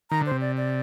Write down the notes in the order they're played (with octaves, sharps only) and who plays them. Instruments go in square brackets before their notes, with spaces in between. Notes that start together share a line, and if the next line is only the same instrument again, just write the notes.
[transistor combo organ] D#3 [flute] A#5
[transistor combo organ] D3
[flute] C5
[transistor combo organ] C3
[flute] D5
D5